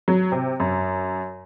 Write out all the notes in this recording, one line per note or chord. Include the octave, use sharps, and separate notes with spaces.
F#3
C3
F#2